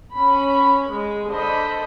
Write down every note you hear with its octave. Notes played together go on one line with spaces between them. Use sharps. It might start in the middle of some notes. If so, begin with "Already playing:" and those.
C#4 B5
G#3
D3 D4 A4 C5 D#5 B5